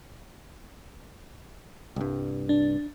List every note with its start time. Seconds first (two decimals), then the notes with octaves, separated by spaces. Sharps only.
1.96 C2 G2
2.49 D4